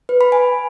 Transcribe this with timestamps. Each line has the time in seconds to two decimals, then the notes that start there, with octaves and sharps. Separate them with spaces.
0.09 B4
0.21 B5
0.32 G#5